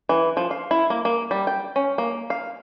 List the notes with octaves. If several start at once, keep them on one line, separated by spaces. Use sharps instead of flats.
E3
F3
F5
E4
A#3
A#3
G3
G5
C#4
A#3
F5